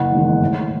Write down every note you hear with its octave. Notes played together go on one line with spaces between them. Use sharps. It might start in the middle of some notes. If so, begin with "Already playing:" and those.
Already playing: F#1 F#5
E2 D#3 G#3
A2